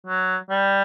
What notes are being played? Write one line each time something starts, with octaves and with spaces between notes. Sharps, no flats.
F#3
G3